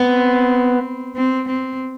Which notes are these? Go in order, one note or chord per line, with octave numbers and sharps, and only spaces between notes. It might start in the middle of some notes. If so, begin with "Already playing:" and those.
Already playing: B3 C4
C4
C4